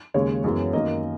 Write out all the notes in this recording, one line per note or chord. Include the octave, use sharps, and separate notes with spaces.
D#2 C#3 G#3 C#4 C#5
F#2 E3 G#3 B3
F#2 D#3 A#3 D#5